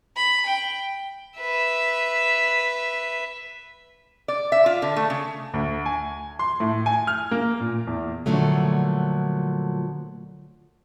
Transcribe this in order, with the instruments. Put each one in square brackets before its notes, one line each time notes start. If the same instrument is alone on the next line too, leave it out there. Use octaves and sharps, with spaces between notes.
[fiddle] B5
G5
[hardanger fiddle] B4 E5
[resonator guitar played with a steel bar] D5
E5
F4
D3
A3
C#3
[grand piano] D2
G#5
C6
A2
G#5
F6
A#3
A#2
E2
[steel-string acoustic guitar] A#2 D3 F3 F#3 A3